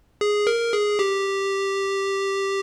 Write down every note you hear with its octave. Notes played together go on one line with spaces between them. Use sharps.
G#4
A#4
G#4
G4